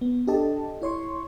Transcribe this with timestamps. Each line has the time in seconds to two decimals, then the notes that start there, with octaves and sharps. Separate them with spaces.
0.01 B3
0.27 D4 G4 A4 D#5 A5
0.82 E4 C#5 C6 C#6